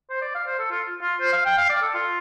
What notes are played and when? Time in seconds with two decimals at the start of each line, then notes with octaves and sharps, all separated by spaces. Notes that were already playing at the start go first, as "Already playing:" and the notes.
0.10 C5
0.22 D5
0.35 F5
0.46 C5
0.59 A4
0.71 F4
1.02 F4
1.20 C5
1.33 F5
1.45 G5
1.57 F5
1.69 D5
1.82 A4
1.94 F4